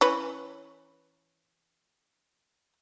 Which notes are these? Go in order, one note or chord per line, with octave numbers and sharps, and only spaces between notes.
E3 C#4 B4